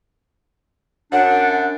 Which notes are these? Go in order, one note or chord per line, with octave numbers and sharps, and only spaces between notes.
F#2 D4 F#5